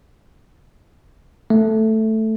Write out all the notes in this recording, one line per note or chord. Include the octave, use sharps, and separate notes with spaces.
A3